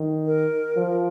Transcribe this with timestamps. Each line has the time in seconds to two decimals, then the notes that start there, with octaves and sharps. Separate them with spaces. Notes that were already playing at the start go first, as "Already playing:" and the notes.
Already playing: D#3
0.26 A#4
0.76 F3